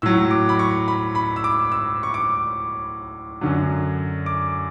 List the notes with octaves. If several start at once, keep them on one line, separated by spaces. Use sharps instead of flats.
A2 F#3 E6
D6
B5
C#6
B5
B5
E6
D6
E6
C#6
D6
F#2 D3 F#3
D6